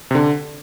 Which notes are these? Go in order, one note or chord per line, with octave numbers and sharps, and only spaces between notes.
C3
D3